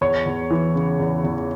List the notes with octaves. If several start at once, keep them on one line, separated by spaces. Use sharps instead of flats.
E2 C#5
E2
E3
C#3
E2
E2